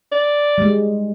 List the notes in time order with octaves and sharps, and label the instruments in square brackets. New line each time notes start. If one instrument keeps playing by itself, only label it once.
[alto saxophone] D5
[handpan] G3 G#3